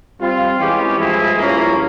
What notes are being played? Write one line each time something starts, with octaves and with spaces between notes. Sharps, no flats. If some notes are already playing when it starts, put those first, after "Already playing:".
G3 C4 F4
E3 G#3 C#4 G4
G2 F3 G#3 E4 G#4
G2 F3 A#3 C#4 E4